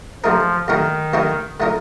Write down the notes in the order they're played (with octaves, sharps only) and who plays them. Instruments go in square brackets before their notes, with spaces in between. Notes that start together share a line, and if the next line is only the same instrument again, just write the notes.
[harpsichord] D#2 D3 A3 D#4 A#4 [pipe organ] F3
[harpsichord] D#2 D3 A3 D#4 A#4 [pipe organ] D#3
[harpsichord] D#2 D3 A3 D#4 A#4
D3 A3 D#4 A#4